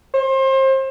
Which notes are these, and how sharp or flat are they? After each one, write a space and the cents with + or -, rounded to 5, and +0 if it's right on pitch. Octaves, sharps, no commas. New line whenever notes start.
C5 +30